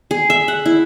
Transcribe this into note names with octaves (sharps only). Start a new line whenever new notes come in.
G#4
E5
F#5
E4